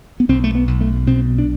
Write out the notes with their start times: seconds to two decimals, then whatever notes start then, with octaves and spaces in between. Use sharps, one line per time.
0.20 B3
0.29 B1 C4
0.44 A3
0.55 B3
0.67 B1
0.81 A3
1.07 B2 C4
1.38 D4